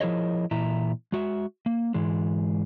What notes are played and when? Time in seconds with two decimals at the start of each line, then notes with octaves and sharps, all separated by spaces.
0.01 F3 E4 G#4 A#4 C#5 D#5
0.51 A#2 E3 E4 E5 A#5
1.12 G#3 F#4 E5
1.66 A#3
1.94 G#2 E3 G#3